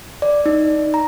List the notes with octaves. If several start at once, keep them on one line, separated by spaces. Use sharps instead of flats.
D5
D#4
A#5